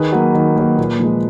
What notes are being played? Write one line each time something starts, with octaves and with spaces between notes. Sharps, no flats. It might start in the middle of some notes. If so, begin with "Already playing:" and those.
Already playing: D#3 G#4 B4
F#3 A#3
D#3
F#3 A#3
A#2
F3 G#3